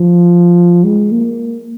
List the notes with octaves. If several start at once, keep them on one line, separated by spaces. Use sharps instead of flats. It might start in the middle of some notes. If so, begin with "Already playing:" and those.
Already playing: F3
G#3
A#3